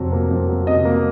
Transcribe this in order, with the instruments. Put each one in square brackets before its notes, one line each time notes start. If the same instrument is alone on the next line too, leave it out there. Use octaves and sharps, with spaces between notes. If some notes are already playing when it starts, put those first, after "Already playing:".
Already playing: [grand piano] F2 C3 F#3
A#3
F2
F#3
C3 D#5
A#3